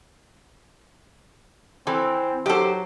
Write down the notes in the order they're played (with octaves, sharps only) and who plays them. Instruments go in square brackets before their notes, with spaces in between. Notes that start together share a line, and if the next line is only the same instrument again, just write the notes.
[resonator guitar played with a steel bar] E3 [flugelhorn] C4 [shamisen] A4
[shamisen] D#3 A4 [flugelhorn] F#3 [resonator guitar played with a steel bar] G4 C5